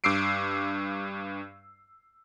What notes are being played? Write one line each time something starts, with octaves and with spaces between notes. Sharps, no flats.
G2 D6 E6 C7 D7